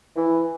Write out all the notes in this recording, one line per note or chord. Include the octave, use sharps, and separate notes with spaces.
E3